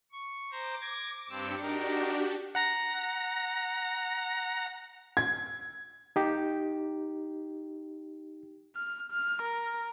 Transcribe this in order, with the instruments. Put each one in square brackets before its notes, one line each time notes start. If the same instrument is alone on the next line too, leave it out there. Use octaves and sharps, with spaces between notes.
[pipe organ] C#6
[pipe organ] C5 A#5 [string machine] D6
[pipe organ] G#6 A#6
[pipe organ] G2 C4 E6 [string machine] D4 G4 C#7
[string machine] D4 F#4 G4 [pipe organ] D#4 A#4
[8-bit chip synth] F#5 A#5 A#6
[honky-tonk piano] G#6
[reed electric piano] D#4 G4
[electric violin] F6
F6
A#4